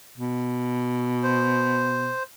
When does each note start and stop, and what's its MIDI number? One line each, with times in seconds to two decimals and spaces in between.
0.18 2.13 47
1.23 2.23 72